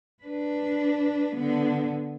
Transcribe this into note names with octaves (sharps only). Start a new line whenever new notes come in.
D4 B4
D3 B3